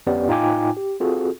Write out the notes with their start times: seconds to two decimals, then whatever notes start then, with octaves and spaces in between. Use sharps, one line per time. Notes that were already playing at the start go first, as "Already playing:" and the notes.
0.06 G1 F2 B3 C#4 G4 D5
0.28 A2 D#4 F4 G5 G#5 D6
0.77 G4
1.00 C4 F4 F#4 G#4 A4